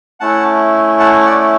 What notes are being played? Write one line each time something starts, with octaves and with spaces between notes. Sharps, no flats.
A3 C#4 E4 F#5 A5
F#5 A5
D5 F#5